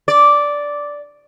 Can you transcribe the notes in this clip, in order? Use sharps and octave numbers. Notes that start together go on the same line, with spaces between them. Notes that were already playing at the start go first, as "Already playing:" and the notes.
D5